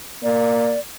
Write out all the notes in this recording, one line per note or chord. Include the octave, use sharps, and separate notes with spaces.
A#3 D5